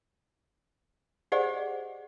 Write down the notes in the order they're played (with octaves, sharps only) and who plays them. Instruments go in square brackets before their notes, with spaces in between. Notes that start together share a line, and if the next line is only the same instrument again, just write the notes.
[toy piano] G4 G#4 C5 D5 D#5 F#5